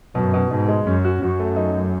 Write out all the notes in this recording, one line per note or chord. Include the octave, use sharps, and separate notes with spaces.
F#2 B2
B2
G#2 B2
G#3
F#2 C#4
F#4
F#2 F#4
A3
D#4
A3